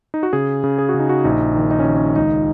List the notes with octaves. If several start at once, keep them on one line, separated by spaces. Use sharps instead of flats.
D#4
F#4
C#3 G#4
C#3
G#4
F#4
C#3
D#4
F#4
A#1 D#4
D#3
D#4
C#4
D#3
C#4
C#2 D#4